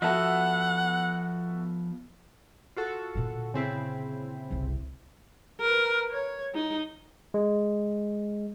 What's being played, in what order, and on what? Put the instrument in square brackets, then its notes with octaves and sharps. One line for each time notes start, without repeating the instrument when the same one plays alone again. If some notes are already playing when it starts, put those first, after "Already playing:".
[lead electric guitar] F3 B3 [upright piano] F#4 A4 E5 [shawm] F#5
[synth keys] F4 F#4 A4
[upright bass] A#2 D3
[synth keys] C#3 C4 E4
[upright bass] F#1 C2
[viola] A#4 B4
C#5
D#4
[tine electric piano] G#3